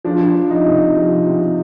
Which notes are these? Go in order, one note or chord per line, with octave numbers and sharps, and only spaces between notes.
F3 D4
F3
D#4
C3
F3
C3